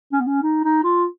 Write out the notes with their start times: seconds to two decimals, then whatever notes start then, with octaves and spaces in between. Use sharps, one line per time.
0.12 C#4
0.20 B3
0.27 C#4
0.43 D#4
0.64 D#4
0.83 F4